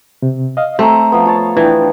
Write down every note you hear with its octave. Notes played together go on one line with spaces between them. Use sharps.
C3
D#5 F5
A3 C4 A#5 C6
F3 B3
F4 C#5 A5
E3 D4 E4 G5